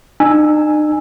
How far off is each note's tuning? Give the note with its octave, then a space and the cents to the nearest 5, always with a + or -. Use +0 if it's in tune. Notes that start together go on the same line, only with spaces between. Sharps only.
D#4 -45 G#5 +0 E6 +0